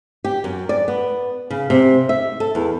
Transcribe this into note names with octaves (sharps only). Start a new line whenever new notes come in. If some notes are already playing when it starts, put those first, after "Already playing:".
G4
F#2
D5
B3
C#3
C3
E5
A4
E2